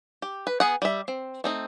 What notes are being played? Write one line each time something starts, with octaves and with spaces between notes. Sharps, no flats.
G4
B4
B3 G#4 F#5
G3 E5
C4
A3 C4 D#4